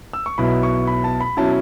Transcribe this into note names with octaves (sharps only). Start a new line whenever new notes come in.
E6
C#6
B1 B2 B3 E4 B5
C#6
B5
A5
B5
B2 F#3 C#4 E4 A5